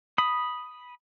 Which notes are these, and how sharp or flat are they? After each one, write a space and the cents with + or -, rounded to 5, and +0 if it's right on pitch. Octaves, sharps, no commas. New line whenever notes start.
B5 -5 D#6 +0